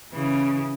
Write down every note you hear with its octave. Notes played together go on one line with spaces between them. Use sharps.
C#3 E3